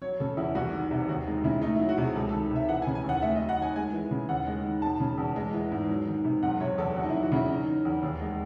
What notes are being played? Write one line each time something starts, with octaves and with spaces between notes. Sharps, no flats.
F#3 C#5
C#3 A4
E2 E4
C2 F#4
D#3
C3
D#2 F#4
G#3 D#4
C#3 E4
A3 D#4
E4
F#3
F#4
C3
G#4
C#2 A4
A4
D#3
C3
E5
E3 F#5
G#5
C#3
G#5
D#2 F#5
A3 E5
D#5
F#3
F#5
D#3 G#5
G#3 G#5
E3
C#3
D#2 F#5
G#3
D#3
E1 A5
C#3
E2
G#3
E3
G#2
F#3
D#3
C3
F#1 F#5
C3 C#5
E2 A4
E2 F#4
D#4
E4
F#3
F#4
C#3 E4
F#3 D#4
D#3
E2
D#2
G#3